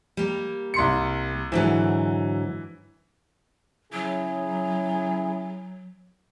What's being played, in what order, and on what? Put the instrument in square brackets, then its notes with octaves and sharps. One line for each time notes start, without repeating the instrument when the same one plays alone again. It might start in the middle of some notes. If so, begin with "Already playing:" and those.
[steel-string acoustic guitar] G3 A#3
[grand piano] C2 C6 C#7
[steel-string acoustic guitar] G#2 D3 F#3 [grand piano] E3
[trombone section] C#3 E4 G#4 [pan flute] F#3